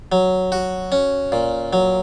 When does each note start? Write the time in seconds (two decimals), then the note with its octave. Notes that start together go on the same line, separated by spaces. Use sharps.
0.12 F#3
0.52 F#4
0.92 C#4
1.32 A#2
1.73 F#3